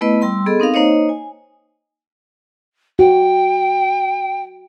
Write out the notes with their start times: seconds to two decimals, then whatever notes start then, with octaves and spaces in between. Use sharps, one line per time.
0.01 A3 B3 E4 B4 D#5
0.21 G3 G5 C6 E6
0.46 B3 G#4 A4 D#5
0.60 C4 D#4 A#4 F5
0.74 A#3 D#4 C5 C#5 D#5
1.09 G#5
2.99 F#4 G5